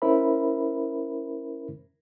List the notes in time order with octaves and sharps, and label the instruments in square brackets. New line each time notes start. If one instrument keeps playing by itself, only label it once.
[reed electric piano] C#4 E4 A#4 C5 E5 B5